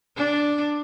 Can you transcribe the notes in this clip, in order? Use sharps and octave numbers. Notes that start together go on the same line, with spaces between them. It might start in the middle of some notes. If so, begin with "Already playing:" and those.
D4